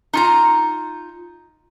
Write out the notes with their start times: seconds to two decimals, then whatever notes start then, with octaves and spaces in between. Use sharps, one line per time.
0.13 D#4 F4 A#5